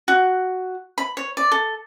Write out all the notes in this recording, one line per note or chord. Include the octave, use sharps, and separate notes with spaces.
F#4
B5
C#5
D5
A4